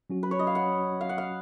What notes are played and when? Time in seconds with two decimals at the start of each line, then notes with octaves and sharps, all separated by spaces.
0.10 F#3 C#4 F#4
0.23 B4
0.31 C#5
0.39 D#5
0.47 F5
0.55 F#5
1.01 F5
1.09 F#5
1.18 F5